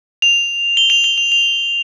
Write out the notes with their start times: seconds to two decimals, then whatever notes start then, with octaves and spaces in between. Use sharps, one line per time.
0.22 F7
0.77 G7
0.90 F7
1.04 G7
1.18 F7
1.32 F7